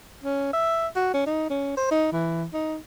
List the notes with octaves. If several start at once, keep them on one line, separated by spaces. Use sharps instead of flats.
C#4
E5
F#4
C#4
D#4
C#4
C5
D#4
E3
D#4